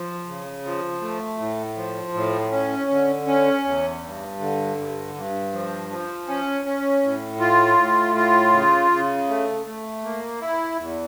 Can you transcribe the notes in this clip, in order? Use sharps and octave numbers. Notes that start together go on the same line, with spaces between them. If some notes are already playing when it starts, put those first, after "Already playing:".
Already playing: F3
C#3
F3
A3
A2
F3
A2
C#4
D3
C#4
E2
G2
D3
G2
G2
F3
F3
C#4
C#4
A2
F4
A2
F4
C#3
C#3
A3
A3
A#3
E4
E2